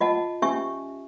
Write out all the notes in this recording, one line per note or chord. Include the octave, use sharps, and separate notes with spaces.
F4 D#5 F#5 A5
C#4 G4 E5 G#5 C#6